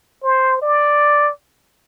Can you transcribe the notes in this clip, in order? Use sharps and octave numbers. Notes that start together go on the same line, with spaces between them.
C5
D5